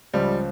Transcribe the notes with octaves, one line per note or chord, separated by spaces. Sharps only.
C#2 C#3 F3 G3